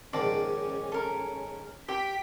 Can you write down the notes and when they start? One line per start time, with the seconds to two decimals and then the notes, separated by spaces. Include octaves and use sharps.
0.13 A#1 G#2 D#3 C#4 D5 A5
0.92 A4 A#4
1.88 G4 G5 B6 D7